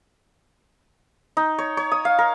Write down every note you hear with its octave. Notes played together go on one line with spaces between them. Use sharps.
D#4
C#5
C#5
D#6
F5
A#4